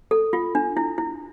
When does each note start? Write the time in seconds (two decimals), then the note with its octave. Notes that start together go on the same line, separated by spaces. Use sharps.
0.11 A4
0.33 F4
0.55 D4
0.77 E4
0.98 E4